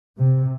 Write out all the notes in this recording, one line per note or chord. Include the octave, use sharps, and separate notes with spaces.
C3